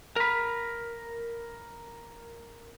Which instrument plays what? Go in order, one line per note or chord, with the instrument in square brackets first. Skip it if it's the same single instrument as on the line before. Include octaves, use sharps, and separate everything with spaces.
[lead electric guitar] A#4 B5